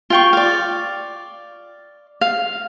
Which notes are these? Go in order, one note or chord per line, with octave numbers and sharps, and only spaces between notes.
F4 G5 C#6
D5 F5
F5